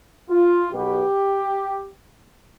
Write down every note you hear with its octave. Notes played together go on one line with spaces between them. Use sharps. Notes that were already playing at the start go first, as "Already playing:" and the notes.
F4
B1 B2 B3 G4